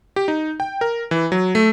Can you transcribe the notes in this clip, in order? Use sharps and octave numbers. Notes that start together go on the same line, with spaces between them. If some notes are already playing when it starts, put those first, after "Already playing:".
G4
D#4
G5
A#4
E3
F#3
A3